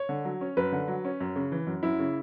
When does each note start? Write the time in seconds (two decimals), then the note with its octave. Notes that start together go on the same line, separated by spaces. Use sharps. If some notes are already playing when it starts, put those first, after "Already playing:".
Already playing: C#5
0.09 D3
0.25 F#3
0.41 C#4
0.57 F#2 B4
0.72 D3
0.88 F#3
1.05 C#4
1.20 F#2
1.36 C#3
1.52 E3
1.67 F#2
1.83 F#2 E4
1.99 C#3